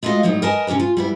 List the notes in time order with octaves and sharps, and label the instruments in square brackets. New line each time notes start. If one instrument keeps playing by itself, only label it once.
[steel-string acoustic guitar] G#3 A3 F4 F#4 D#5 F5
A2 F#3 G3 A3 D#4
A#4 B4 D#5 G#5 A5
C3 C#4 F#4 G4 A#4
F4
G3 B3 E4